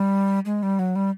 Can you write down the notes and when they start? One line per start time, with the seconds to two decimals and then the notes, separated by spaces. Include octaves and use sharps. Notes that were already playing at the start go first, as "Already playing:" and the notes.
Already playing: G3
0.45 G#3
0.63 G3
0.79 F#3
0.96 G3